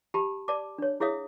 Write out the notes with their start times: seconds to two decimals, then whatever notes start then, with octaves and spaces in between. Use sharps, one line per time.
0.14 G4 A5 B5
0.48 D5 A5 D6
0.78 D4 C#5
1.00 E4 G#4 C#5 E5 F5 D#6